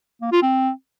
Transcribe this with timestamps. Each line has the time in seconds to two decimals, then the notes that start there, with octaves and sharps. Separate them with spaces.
0.22 A#3
0.32 F4
0.43 C4